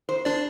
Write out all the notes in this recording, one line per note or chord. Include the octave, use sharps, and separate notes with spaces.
C5
D4 C5 D5